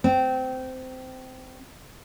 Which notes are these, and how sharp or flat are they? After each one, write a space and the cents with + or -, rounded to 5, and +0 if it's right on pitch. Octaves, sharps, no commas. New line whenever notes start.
C4 -20